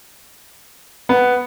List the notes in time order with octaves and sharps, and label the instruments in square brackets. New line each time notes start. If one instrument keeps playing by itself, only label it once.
[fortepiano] B3